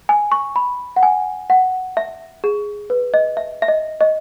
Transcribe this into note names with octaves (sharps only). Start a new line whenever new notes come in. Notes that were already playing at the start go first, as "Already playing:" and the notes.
G#5
C#6
B5
F#5
G#5
F#5
E5
G#4
B4
D#5
E5
E5
D#5
D#5